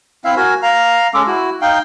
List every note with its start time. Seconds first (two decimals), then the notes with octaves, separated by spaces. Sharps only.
0.24 C4 E4 E5 F5
0.37 F#4 A#4 G#5
0.63 F5 A#5
1.14 G#3 C#4 A4 D6
1.27 E4 F#4
1.62 D#4 F5 G5